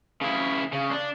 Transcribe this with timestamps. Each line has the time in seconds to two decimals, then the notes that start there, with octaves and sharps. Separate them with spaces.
0.22 C#3 E4
0.73 C#3
0.91 D4